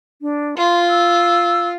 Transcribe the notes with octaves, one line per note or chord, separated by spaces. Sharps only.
D4
F4 C6
E6